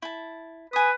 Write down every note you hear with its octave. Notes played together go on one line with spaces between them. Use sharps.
E4 A5
B4 G#5 D#6